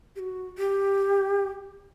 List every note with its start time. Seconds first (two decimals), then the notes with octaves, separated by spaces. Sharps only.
0.16 G4
0.19 F#4
0.58 G4